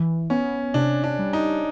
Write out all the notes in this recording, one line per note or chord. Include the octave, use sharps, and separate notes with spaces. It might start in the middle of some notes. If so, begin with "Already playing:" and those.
Already playing: E3
B3 C#4
C3 D4
D4
G3
D#4